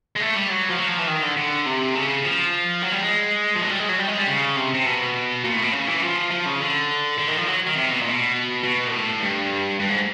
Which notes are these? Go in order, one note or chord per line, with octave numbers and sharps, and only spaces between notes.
G#3
A3
G3
F#3
F3
F#3
F3
E3
D#3
D3
D3
C3
C#3
F3
F#3
G3
G#3
F3
F#3
G3
G#3
F#3
G3
G#3
G3
C#3
C3
C3
B2
A#2
A2
B2
C#3
E3
F3
F3
C#3
D3
D3
D#3
F3
F#3
D#3
C3
B2
A#2
B2
B2
A#2
A2
G2
G2
G#2